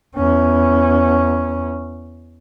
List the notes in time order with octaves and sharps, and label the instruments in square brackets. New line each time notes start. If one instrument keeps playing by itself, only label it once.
[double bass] E2 C#4